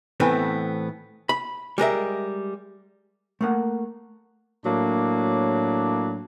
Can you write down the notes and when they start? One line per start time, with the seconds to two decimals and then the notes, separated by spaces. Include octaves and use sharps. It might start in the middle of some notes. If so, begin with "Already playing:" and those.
0.20 A2 E3 A3 B3 C4
1.29 B5
1.78 G3 G#3 A#4 E5
3.41 A3 A#3 F#5
4.66 A2 F#3 A#3 D4